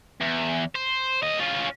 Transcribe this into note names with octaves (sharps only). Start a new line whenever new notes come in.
E2
C5
D#2 D#5
C#4 F4